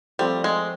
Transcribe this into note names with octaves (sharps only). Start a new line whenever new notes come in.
F3 G3 A3 C4
G#3